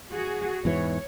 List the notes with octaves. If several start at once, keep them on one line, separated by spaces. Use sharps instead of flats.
F#4 G#4
E2 G#2 E3 C#5